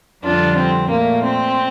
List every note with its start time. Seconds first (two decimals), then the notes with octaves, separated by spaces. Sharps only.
0.24 F2 D3 G3 D4 F4
0.57 C4
0.89 A#2 A3 A#3
1.23 C4